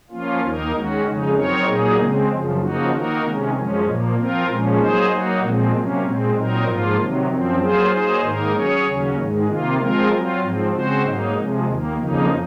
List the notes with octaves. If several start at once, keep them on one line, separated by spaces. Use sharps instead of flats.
F3 A#3 C#4 F4
D#2 D#3 A#3 D#4 A#4
D#3 G#3 C#4 F#4
F2 C#3 G#3 D#4
F#3 C4 D#4 A#4 C#5
A#2 F#3 A#3 D#4 G#4
C#3 G#3 C4
F#2 C#3 F3
C#3 F3 A#3 D#4 F#4
D#3 A#3 D#4 F#4 A#4
C3 D#3 G#3 C#4
F#2 F3 G#3 C#4
A#2 F3 A#3
F3 C4 F4 A#4
A#2 F3 G#3 C#4
F#3 A#3 D#4 G#4 C5
F#3 A#3 D#4 F#4
A#2 F3 G#3 C4
C3 F#3 A#3 C#4
A#2 G#3 C4
A#2 F#3 C4 D#4 A#4
G#2 F3 A#3 F4
C3 D#3 F#3
F#2 F3 C4
F#3 A#3 F4 G#4 C5
F#3 A#3 D#4 G#4 C5
G#2 D#3 A#3 D#4 A#4
F#3 C#4 G#4 C#5
D#2 C#3 F#3 C#4
G#2 D#3 G#3
C3 D#3 A#3 F4
F3 G#3 C4 F4 A#4
F#3 C4 F4
G#2 F3 C4
C#3 G#3 C4 F#4 C5
G#2 F#3 A#3 D#4
C3 F3 G#3
D#2 D#3 A#3
F2 C#3 F3 A#3 D#4